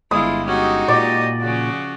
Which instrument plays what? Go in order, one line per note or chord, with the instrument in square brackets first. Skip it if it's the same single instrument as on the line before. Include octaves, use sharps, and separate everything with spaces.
[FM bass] G1 [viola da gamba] G#3 [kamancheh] E4 F4 [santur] D#6
[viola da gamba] G#3 D#4 F#4 [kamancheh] C#4 G4
[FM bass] A#2 [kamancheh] G4 D#5 [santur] D5
[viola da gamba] C#3 F3 C#4 [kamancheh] F#4